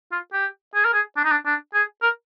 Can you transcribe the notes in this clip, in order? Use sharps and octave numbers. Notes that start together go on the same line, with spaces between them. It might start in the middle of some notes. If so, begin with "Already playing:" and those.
F4
G4
G#4
A#4
G#4
D4
D#4
D4
D4
G#4
A#4